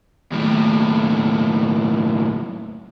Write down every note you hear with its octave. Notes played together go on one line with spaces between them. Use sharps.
D#2 A2